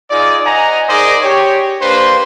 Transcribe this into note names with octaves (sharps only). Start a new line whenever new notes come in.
D#4 F4 G#4 D5
C5 D#5 F#5 G#5 A#5
D#4 G#4 A#4 C5 D5 D#5
G4 C#5
A#3 D4 G4 B4 C5